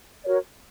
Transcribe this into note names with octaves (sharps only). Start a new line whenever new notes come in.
F#4 A#4 C#5 D5